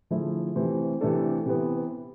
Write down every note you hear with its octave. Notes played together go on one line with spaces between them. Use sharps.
D3 F3 A3 E4 G#4
C3 E3 A3 C4
C3 E3 A3 D4 A4
C3 E3 B3